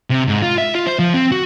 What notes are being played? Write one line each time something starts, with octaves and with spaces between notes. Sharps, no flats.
C3
G#2
F4
E5
F4
C5
F3
C4
F#4